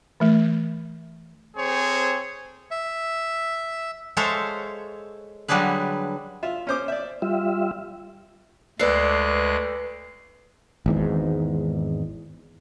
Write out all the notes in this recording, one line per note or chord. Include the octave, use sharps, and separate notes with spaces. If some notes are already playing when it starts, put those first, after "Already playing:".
E3 A3
C4 G#4 A4 C5 C#5
E5
G#3 A4 C5 C#5 E5 F5
D3 F#3 G3 D4 G#4 B4
F4 E5
C#4 C5 D6
D5 E5
G3 F4 E5
D2 G#3 A4 B4 D5 F#6 C7
G#1 E2 G#2